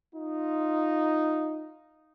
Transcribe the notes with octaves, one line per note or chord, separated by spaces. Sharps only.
D#4 F4